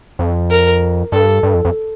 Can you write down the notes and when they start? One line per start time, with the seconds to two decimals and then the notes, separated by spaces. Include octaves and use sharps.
0.19 F2
0.50 A#4
1.12 G2 A4
1.43 G2
1.54 F2
1.65 F2